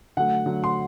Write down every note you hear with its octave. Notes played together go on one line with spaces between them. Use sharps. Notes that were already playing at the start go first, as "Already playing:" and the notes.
D3 F#3 A3 F#5
D3 F#3 A3
C6